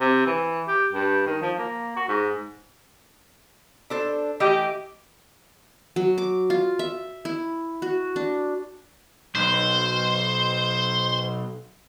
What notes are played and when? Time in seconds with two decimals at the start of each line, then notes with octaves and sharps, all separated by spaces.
0.01 C3
0.26 E3
0.68 G4
0.93 G2
1.27 D#3
1.42 F3
1.59 A#3
1.96 F#4
2.09 G#2
3.90 D4 A4 C5
4.40 E3 A3 G4 D#5
5.96 F#3
6.18 D6
6.50 F4
6.79 E5
7.25 E4
7.82 F#4
8.16 D4
9.35 B1 C5